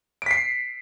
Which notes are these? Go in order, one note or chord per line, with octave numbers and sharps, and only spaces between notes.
B6 C7 D7